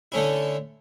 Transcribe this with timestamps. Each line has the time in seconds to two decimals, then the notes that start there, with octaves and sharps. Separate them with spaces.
0.12 D3 A3 C#4 E4